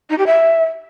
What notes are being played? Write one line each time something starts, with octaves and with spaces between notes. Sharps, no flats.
D#4
G4
E5